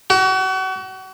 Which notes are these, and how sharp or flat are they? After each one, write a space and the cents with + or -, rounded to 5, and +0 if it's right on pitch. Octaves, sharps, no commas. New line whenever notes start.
F#4 +35